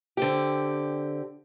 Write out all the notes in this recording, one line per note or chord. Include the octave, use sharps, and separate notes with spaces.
D3 C4 G4